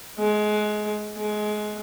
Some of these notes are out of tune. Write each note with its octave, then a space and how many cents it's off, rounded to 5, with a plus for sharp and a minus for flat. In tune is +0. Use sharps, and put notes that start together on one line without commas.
G#3 +25
G#3 +25